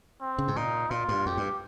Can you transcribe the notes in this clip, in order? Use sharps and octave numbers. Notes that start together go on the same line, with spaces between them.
C4
C#3
G#2
A#2 D#4
A#2 F4
G2
F2 G4
G2